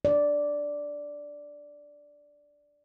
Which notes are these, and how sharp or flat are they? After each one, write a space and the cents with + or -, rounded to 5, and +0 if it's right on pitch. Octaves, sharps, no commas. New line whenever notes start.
D5 -5